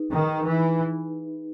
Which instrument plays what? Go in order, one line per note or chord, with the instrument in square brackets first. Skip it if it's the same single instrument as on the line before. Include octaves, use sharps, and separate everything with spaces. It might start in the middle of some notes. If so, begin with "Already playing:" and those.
Already playing: [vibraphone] D#4 G#4 B4
[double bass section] D#3
E3